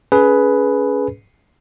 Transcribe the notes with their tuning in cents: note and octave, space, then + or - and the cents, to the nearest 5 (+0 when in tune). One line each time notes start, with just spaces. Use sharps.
C#4 +20 G#4 +20 B4 +0